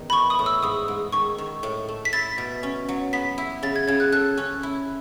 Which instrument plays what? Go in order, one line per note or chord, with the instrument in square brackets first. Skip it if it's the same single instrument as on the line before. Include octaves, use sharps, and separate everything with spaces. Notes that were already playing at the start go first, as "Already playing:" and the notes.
Already playing: [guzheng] E2 G#2 D#3
[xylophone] B5
[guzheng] E3 [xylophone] C#6
[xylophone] D#6
[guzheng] A2
[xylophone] E6
[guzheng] G#2 [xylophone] D#6
[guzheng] G#2
[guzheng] D#3 [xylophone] C#6
[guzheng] D#3
A2
A3
[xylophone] B6
[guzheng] E4 [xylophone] A6
[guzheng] B2
C#4
F#3
[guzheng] B3 [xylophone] B6
[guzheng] E4
[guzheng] C#3 [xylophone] A6
[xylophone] G#6
[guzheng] C#3 [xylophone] G#6
[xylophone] F#6
[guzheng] A4 [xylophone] F#6
[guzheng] C#4
E4